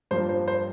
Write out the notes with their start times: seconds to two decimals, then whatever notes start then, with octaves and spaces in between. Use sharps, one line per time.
0.11 G2 F3 A#3 C5
0.29 C5
0.48 C5